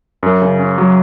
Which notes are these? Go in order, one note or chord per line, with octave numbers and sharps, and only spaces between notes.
F#2
C#3
C#4
F#3